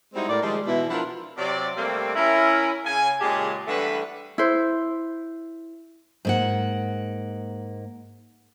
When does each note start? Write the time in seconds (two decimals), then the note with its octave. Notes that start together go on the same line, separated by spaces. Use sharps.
0.15 G3 G#3 C4 D#4 E4 F#4
0.29 A2 A#4 D5
0.43 D#3 F3 G3 G#3
0.67 B2 E3 E4
0.90 F3 D4 E4 F4 A#4 F#5
1.38 C3 F#3 D5
1.76 C3 G3 A3 A#3 C4
2.16 C#4 E4 A#4
2.85 C#3 G#5
3.20 A#2 C#3 G#3 G4 G#4 A5
3.68 D3 E3 G3 A3 B3 B4
4.38 E4 C5
6.25 G#2 A#3 F#5